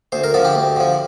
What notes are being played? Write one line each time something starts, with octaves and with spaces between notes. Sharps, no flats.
D2 C5
A#4
D3 F3 A4
G4
D2
D3 F3